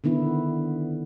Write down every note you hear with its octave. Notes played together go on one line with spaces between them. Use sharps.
D3 D#3 B3 E4